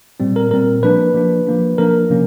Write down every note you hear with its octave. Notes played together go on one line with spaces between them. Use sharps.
A#2 G3 C4
A#4
A#2 G3 C4 A#4
F3 A#3 D4 B4
F3 A#3 D4
F3 A#3 D4
F3 A#3 D4 A#4
C3 F3 A#3 C#4